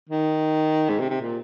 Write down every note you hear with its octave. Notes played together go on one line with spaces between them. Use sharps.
D#3
G#2
C3
C3
A#2